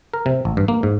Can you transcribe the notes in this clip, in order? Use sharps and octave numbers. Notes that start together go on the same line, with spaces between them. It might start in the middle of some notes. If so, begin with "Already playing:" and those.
A#4
C3
A1
G2
A#3
G#2